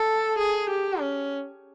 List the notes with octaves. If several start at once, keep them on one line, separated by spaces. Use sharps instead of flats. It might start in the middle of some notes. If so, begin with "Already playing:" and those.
Already playing: A4
G#4
G4
C#4